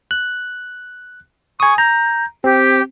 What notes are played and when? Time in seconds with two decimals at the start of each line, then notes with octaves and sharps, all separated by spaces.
0.11 F#6
1.60 G#5 C#6 D#6
1.78 A#5 G6
2.44 C4 G4